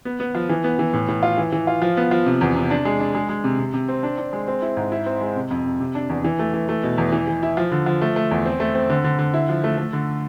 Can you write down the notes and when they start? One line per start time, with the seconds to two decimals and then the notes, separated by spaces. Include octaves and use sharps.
0.05 B3
0.20 B3
0.35 F3
0.49 E3
0.64 B3
0.79 E3
0.93 A2
1.08 A2
1.23 F4
1.37 E3
1.52 E3
1.67 F4
1.82 F3
1.97 B3
2.11 F3
2.26 C3
2.41 E2
2.56 C3
2.71 D4
2.85 G#3
3.00 D4
3.15 G#3
3.29 G#3
3.44 C3
3.59 C3
3.74 C3
3.88 C4
4.03 D4
4.18 D4
4.33 G#3
4.48 C4
4.62 E4
4.77 G#2
4.92 E4
5.06 C4
5.21 G#3
5.36 C3
5.51 F2
5.65 C3
5.80 C3
5.95 D4
6.10 E2
6.24 E3
6.39 A3
6.54 E3
6.69 A3
6.83 B2
6.98 E2
7.12 E3
7.27 E3
7.43 E4
7.57 F3
7.72 D3
7.86 F3
8.01 A3
8.16 A3
8.31 E2
8.46 C4
8.60 A3
8.75 C4
8.90 D3
9.04 D3
9.19 D3
9.34 E4
9.49 F3
9.64 A3
9.78 A3
9.93 D3